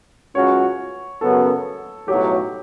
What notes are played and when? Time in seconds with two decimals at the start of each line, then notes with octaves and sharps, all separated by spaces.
0.35 C#2 C#3 F#3 C#4 F#4 C#5
1.21 F#2 C#3 F#3 B3 A4
2.08 B1 A2 F#3 G4